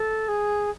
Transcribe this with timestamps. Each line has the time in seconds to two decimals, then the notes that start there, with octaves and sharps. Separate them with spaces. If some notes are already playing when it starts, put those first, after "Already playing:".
Already playing: A4
0.28 G#4